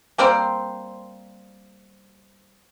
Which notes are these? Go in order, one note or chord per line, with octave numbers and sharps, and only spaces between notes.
G3 A#3 C4 C5